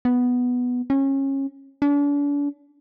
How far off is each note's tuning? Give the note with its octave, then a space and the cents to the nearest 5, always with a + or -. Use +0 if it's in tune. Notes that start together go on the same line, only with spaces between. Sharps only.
B3 +0
C#4 -25
D4 -40